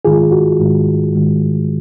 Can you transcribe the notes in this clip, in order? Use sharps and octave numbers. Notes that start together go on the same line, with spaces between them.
G#2 D#3 G#3 F4 G#4
F#4
G#2 D#3 G#3
G#2 D#3 G#3